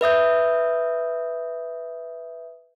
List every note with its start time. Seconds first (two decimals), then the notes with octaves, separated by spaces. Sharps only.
0.01 B4 E5 D#6 G6